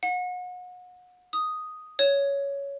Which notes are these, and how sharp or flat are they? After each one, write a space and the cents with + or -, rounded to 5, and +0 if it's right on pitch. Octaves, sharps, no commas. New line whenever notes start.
F#5 -35
D#6 +0
C#5 +10